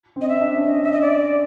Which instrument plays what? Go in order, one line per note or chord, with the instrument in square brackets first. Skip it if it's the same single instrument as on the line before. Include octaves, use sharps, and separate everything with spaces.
[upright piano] C4
[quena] D#5
E5
[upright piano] D4
C#4
[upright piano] D4 [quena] D#5
[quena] E5
D#5
D5